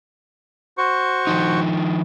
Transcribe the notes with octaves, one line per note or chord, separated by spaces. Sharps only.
F#4 C5 C#6
D#3 F3 D#4